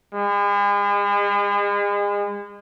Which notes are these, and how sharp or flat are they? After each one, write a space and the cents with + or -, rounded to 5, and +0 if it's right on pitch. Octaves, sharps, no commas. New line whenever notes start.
G#3 -40